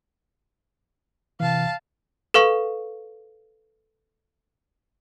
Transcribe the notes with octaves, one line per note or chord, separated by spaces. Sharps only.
C3 E3 F5 A5
A4 B4 F5 C#6